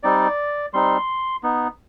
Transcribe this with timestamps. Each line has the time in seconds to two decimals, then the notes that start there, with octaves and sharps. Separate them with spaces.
0.03 G3 C4 D#4 D5
0.73 G3 C4 D#4 C6
1.43 B3 D#4